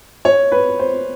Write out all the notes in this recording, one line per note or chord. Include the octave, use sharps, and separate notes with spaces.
C#5
B4
C5